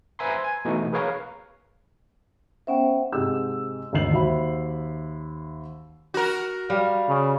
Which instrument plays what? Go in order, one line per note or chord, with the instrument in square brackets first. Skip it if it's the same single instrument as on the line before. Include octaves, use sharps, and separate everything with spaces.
[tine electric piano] B4 C5 E5 G#5 A#5 C6
G#5
B2 E3 A3 D#4
G#4 A#4 B4 C#5 F5 A#5
[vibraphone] B3 C#4 C5 [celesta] E5 F#5 G5
[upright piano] G#2 C3 G4 E6
G#1 D2 D#3 C7 F#7
D#2 F#4 C5 E5 B5
[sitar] F#4 A#4
[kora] G3 [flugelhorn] F5
[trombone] C#3